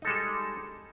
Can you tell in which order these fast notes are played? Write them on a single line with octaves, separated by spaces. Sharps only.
D#4 A4 G#3 G3